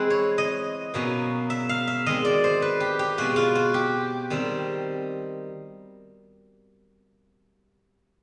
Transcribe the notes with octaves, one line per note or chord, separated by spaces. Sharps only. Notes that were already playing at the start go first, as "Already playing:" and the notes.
Already playing: E3 G#3 C4 E4 F#5
C#5
D#5
B2 F#3 A#3 C#4
E5
F5
E5
D#3 G#3 C4 D#5
D5
C5
B4
G4
G4
B2 G#3 C4 F4 F#4
F4
F#4
G4
D#3 G3 C4 D#4